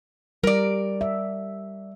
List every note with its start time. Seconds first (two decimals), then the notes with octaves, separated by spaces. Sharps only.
0.43 G3 A#4 D5
1.01 E5